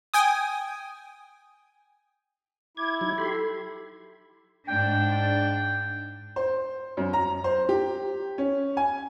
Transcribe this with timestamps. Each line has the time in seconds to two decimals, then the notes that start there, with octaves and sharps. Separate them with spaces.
0.14 G5 G#5 D#6
2.77 E4 D6 G#6
3.01 F#3 D#4 G#6
3.18 G4 A4 B5 C6
4.68 G#2 D4 G5
6.36 C5
6.97 F#2
7.13 A#5
7.44 C5
7.69 G4
8.38 C#4
8.77 G#5